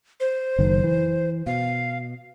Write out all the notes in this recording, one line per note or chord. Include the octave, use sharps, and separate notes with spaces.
C5
F#1 D#3
E3
B2 F5